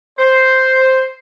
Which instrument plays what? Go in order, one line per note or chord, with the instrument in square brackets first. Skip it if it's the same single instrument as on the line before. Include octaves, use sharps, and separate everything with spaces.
[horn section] C5